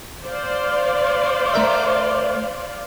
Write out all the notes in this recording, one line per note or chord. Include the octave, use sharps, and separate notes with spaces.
C5 D5 F5
A3 A#4 E5